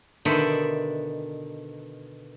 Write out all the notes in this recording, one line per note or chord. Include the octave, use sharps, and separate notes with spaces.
B2 D3 D#3 C5 D5 E5